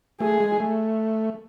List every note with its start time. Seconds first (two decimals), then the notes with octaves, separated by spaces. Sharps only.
0.20 A3 G#4
0.40 G#3
0.60 A3